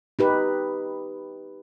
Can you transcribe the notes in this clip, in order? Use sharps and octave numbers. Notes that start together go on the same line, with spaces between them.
D#4 G4 B4